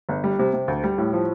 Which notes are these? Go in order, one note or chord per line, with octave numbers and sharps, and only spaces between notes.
G1
G3
C3
C3
D2
G3
A2
F3